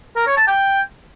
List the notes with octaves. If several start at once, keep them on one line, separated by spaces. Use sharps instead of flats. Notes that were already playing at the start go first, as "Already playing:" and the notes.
A#4
C#5
A5
G5